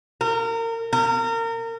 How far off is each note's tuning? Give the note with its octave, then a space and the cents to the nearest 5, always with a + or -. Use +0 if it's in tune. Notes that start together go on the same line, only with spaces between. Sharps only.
A#4 -30
A#4 -30